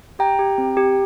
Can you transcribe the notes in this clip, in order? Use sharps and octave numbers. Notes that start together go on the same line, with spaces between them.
G4 G5 A#5
G4
C4
G4